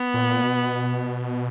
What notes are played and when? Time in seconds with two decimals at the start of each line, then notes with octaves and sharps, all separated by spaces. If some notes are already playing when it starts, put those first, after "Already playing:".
Already playing: B3
0.14 A#2
0.42 B2